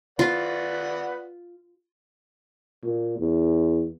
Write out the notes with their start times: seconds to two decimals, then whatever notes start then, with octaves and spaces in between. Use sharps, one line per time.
0.19 F4 B4 D5 F#5
2.84 A#2
3.19 E2